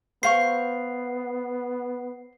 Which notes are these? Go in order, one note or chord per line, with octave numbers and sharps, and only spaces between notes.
B3 C5 F5 C#6 C7